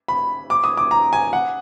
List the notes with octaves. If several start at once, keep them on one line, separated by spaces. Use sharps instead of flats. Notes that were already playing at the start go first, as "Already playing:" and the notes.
B5
D6
D#6
D6
A#5
G#5
F#5